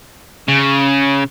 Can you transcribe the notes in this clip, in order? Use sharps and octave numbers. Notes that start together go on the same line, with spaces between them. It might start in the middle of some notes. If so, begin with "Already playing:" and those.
C#3